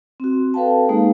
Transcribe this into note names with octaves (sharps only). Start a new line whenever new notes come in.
C4 F#4
A4 B4 F5 G5 A5
G#3 A#3 D#4 G#4